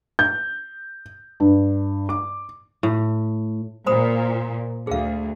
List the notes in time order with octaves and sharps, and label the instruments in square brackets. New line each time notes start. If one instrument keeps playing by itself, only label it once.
[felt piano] G6
G2
D6
[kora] A2
[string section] A#2 [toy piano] C5 B5 D#6
[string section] D2 [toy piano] G#4 F5